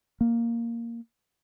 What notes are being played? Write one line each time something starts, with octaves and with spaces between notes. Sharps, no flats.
A#3